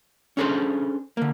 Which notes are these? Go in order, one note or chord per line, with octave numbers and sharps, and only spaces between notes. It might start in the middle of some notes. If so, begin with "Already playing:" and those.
C#4 D4 G#4 A4 B4 C5
D3 A#3